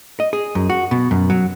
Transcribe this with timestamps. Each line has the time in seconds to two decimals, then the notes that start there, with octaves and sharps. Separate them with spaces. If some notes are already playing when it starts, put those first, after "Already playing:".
0.20 D#5
0.33 G#4
0.55 F#2
0.70 F#4
0.91 B2
1.11 F#2
1.30 F#3